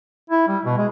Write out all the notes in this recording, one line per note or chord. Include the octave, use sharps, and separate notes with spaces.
E4
G3
B2
G#3